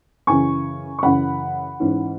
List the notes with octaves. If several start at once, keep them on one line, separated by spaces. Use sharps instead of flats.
F#2 C#3 E3 C#4 G#5 C#6
C#6
F#2 C#3 E3 C#4 F#5 B5
G#2 E3 C#4